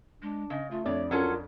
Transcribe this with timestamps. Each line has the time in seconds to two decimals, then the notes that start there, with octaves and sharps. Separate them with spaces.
0.22 G#3 D4
0.50 C#3 D#5
0.71 A3 F4
0.86 F2 D4 C#5 D5
1.11 F#3 C#4 F4 A4 A#4